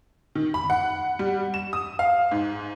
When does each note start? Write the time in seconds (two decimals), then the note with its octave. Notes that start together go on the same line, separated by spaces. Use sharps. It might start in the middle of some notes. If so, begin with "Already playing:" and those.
0.35 D#3
0.54 B5
0.70 F#5
1.19 G3
1.54 E7
1.73 D#6
1.99 F5
2.31 G#2